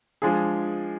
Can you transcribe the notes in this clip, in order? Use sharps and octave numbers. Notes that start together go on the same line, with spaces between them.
F3 G#3 D4 G#4